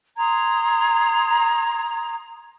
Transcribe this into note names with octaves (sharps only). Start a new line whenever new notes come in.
A#5 C6 D#6 G#6